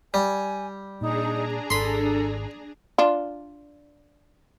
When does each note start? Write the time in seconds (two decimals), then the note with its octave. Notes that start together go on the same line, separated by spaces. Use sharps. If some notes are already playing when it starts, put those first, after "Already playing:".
0.14 G3 G#5
1.01 A#2 D4 D#4 G#4 A#5
1.70 G#1 A4 B5 C6
2.98 D4 F4